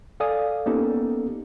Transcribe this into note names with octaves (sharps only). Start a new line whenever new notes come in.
A4 D5 F5 G#5 D#6
A#3 B3 C#4 D#4 G4 A4